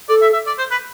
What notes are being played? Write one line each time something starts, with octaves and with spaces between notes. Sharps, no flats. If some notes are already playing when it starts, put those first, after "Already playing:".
A4 D5
E5
E5
D5
C5
B4